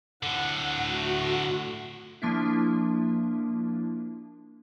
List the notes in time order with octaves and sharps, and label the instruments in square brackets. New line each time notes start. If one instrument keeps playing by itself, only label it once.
[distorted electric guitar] A2 D3 [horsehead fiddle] F#5
[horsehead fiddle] A3 F#4
[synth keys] F3 A#3 D4 E4